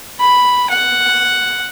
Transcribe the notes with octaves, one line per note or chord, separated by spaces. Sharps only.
B5
F#5